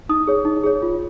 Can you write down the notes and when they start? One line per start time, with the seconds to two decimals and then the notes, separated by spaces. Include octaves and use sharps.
0.09 D#4 D#6
0.27 G#4 C#5
0.45 D#4
0.64 G#4 C#5
0.82 F4